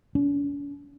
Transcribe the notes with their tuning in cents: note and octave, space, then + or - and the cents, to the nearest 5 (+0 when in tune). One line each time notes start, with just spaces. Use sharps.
C#4 +45